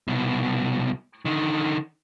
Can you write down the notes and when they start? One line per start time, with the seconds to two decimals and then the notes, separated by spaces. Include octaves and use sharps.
0.07 C2 B2
1.25 D3 D#3